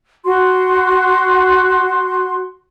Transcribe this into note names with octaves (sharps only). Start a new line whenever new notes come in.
F#4 C6